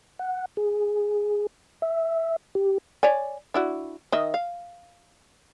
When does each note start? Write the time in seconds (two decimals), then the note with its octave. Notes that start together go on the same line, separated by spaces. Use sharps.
0.19 F#5
0.57 G#4
1.82 E5
2.55 G4
3.03 C#5 D5 G#5
3.54 D4 E4 F#4
4.12 D#3 D#5 E5
4.34 F5